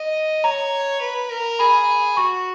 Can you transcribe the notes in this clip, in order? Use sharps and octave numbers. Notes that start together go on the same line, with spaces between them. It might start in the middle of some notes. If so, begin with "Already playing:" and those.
Already playing: D#5
C#5 A#5
B4
A#4
G#4 B5
F#4 C#6